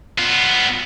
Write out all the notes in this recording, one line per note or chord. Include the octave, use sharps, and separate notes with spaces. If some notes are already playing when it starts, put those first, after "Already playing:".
B3 F4